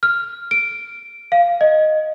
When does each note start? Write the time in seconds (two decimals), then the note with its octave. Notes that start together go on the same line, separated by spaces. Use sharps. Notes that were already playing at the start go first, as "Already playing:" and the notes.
0.03 F6
0.51 D7
1.32 F5
1.61 D#5